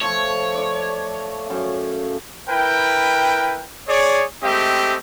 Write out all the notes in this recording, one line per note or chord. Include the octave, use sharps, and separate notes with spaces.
F3 A3 C#5
D5 C#6
F#2 F5
E4 A#4 B4 G5
G#4 C#5 D5
G#3 A3 C4 G4 D#5 E5